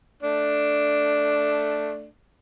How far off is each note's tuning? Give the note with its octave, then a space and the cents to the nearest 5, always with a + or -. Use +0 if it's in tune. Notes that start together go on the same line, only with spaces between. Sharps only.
A3 +0 D4 +0